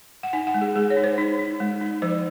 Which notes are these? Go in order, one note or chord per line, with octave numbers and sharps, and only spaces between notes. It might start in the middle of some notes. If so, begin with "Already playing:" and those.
F#5
D#4 G#5
F#5
G#3
G#4
G#3 G#4
C#5
D#4
C5
D#4
D#4
G#3
D#4
F3 C5